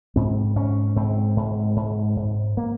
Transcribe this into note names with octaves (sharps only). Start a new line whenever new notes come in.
G#2 C4
G#2 C#4
G#2 C4
G#2
G#2
G#2
A#3